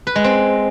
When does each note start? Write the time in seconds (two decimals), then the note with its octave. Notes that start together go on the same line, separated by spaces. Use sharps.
0.07 B4
0.15 G#3
0.24 C4